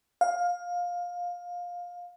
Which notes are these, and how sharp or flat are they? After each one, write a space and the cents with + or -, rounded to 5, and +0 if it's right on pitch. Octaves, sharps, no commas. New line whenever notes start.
F5 +20